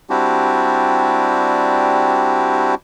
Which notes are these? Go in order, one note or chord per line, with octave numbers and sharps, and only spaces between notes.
G3 C4 D4 E4 F#4 G4